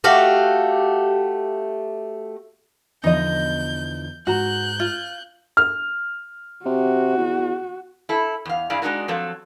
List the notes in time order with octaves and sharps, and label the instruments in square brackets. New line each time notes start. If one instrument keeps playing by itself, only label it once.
[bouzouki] A3 F#4 G4 F5
[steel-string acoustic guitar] E2 D3 F3 [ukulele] D#4 D#5 [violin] G6
[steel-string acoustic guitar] G#2 A#5 [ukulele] F#4 [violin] F#6 G6
[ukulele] F4
[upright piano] F6
[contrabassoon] C3 [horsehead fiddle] F#4
[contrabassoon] E2
[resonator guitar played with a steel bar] E4 A4
E2 F5
G2 E4 G#4 D5 F5
G#3 D4 D#4 F#4 A#4
F3 F#3 C4 A4 C#5